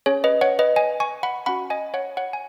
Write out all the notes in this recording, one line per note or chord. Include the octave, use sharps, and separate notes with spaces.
C#4 G#4 C#5
B4 D#5
C#5 F#5
B4 D#5
D#5 G#5
G#5 C#6
F#5 B5
C#4 F#4 F#5 B5
D#5 G#5
C#5 F#5
C#5 F#5
G#5